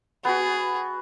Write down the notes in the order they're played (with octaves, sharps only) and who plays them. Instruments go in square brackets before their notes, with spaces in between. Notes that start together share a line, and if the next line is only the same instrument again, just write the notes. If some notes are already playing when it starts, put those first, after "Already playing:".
[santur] B3 F#4 [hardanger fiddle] G#4